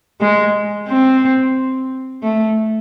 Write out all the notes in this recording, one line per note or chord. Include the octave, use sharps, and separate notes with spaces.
G#3
C4
A3